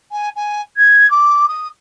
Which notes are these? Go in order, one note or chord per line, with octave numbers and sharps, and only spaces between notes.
G#5
G#5
G#6
D6
D#6